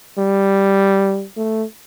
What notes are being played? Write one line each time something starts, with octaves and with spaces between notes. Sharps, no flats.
G3
A3